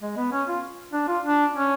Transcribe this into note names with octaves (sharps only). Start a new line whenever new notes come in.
G#3
B3
C#4
F4
D4
F4
D4
C#4